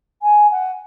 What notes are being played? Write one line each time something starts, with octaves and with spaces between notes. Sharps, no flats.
G#5
F#5